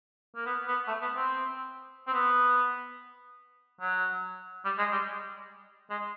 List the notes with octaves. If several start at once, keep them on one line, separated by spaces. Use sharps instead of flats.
A#3
B3
B3
A3
B3
C4
C4
B3
F#3
G3
G#3
G3
G#3